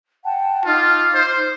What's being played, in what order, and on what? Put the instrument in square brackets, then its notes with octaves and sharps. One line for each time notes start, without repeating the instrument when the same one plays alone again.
[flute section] F#5 G5 A5
[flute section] D#4 D6 F6 [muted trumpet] F4
[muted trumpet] C5